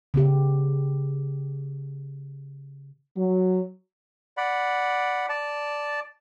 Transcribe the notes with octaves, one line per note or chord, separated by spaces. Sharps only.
C#3 B3 G4
F#3
D5 F#5 B5
D5 A5